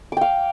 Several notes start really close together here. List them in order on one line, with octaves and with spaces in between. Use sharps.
D6 G5 F5